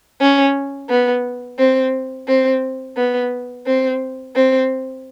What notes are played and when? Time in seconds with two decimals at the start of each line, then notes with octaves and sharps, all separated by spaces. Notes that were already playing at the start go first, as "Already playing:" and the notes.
0.21 C#4
0.89 B3
1.59 C4
2.28 C4
2.97 B3
3.66 C4
4.35 C4